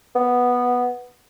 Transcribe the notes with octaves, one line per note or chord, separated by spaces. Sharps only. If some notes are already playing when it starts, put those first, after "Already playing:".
B3